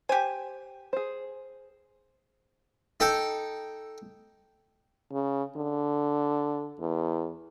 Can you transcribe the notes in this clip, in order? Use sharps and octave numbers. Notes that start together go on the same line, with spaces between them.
G4 C5 G#5
G#4 C5
D#4 A4 G5
C#3
D3
E2